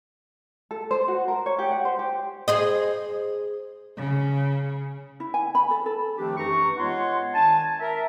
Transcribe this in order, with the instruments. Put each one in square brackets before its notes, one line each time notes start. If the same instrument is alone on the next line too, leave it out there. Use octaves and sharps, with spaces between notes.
[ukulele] A4
C5
F#4
A#4
C#5
G4
F#5
C5
G4
[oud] G#4 C5 D#5
[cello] C#3
[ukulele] E4
G#5
B5
A4
A4
[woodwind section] D#3 F3 A3 C4 D4 G4
F#2 E3 D#4 A#5 C#6
G#3 B3 F4 C#5 F#5 C6
D#3 D4 G#5 A5
A#4 E5